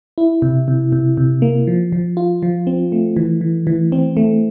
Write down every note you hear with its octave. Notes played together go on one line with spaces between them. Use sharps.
E4
C3
C3
C3
C3
A#3
F3
F3
F4
F3
C4
A3
E3
E3
E3
C4
A3